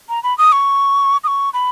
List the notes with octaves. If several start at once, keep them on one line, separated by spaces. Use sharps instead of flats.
A#5
B5
D#6
C#6
D#6
C#6
B5